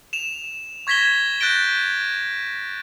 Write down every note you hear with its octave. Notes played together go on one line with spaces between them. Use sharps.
E7 F7
C#6 G#6 A#6 B6 E7 G7
F#6 G6 A6 A#6 D7 G7